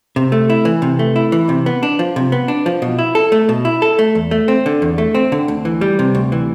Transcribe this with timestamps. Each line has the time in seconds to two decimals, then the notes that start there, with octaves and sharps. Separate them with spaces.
0.16 C3
0.32 A3
0.50 E4
0.65 E3
0.82 C3
0.99 A3
1.16 E4
1.32 E3
1.49 C3
1.66 B3
1.83 D4
1.99 F3
2.16 C3
2.32 B3
2.48 D4
2.66 F3
2.82 B2
2.99 E4
3.15 A4
3.32 A3
3.49 B2
3.65 E4
3.82 A4
3.99 A3
4.15 E2
4.31 A3
4.48 C4
4.66 D3
4.82 E2
4.98 A3
5.15 C4
5.32 D3
5.48 D2
5.65 E3
5.81 G3
5.99 C3
6.15 D2
6.32 E3